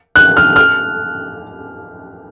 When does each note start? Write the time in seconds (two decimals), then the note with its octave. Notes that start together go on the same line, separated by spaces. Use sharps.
0.16 F#6
0.37 F6
0.56 F6